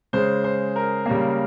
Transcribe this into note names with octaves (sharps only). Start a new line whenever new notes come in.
C#3 G#3 C5
C5
A#4
C#3 G3 A#3